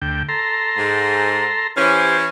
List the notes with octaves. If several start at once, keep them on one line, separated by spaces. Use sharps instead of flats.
D2 G5
A4 A#5 C6
G#2
E3 C#4 G4 C5